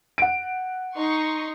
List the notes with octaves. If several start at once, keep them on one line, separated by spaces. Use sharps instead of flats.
F#5 D7
D#4 C6 C#6